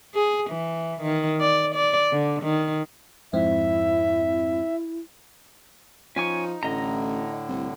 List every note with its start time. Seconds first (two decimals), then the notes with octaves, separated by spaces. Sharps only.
0.14 G#4
0.50 E3
1.02 D#3
1.40 D5
1.75 D5
2.12 D3
2.43 D#3
3.33 F2 G#2 C4 E4 E5
6.16 F3 C#4 D#4 G#5 C#6
6.63 A1 A2 D3 D#5 A#5
7.49 C2